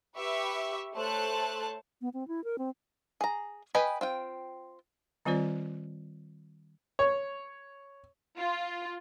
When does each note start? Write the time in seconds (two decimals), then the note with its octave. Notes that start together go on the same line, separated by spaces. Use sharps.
0.16 G4 B4 E5 C#6
0.95 A3 C5 C#5 A5 F#6
2.01 B3
2.14 C4
2.28 E4
2.44 A#4
2.58 C4
3.21 G#4 A#5
3.75 B4 D#5 G5 G#5 B5
4.01 C4 F4 G5
5.25 D#3 G3 C4 F4 C5 D5
6.99 C#5
8.38 F4